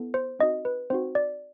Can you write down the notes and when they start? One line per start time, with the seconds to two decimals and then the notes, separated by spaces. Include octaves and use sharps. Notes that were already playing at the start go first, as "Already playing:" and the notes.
Already playing: B3 E4 A4
0.14 C5
0.39 C4 D#4 F#4 D#5
0.65 B4
0.90 C4 D#4 F#4 C5
1.15 D5